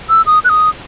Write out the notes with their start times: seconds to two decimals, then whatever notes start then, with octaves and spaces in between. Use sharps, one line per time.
0.09 E6
0.27 D#6
0.45 F#6
0.49 D#6